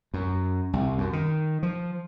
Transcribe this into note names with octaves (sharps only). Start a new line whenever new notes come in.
F#2
C2
F#2
D#3
F3